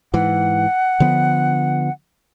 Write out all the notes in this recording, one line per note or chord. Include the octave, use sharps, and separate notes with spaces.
G#2 E3 F#5
D3 F3 B3